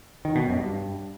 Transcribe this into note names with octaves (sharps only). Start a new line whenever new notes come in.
D#3
B2
F#2
G2